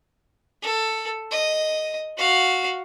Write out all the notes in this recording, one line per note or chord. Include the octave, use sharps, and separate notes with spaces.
A4
D#5
F#4 F5